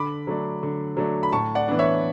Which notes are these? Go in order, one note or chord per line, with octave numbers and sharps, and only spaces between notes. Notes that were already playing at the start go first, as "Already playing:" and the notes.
Already playing: D3 B5 D6
F#3 A3 D4
D3
F#3 A3 D4
B5
A2 A5 C#6
D5 F#5
E3 B3 D4
C#5 E5